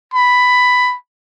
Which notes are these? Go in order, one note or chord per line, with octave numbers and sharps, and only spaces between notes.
B5